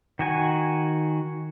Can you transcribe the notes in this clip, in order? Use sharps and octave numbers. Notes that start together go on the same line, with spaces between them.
D#3 F#4 G#5